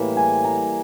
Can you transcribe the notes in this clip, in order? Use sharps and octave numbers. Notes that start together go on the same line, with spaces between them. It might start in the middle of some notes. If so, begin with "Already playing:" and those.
Already playing: A2 E3 G3 A#3 E5
G#5
A#5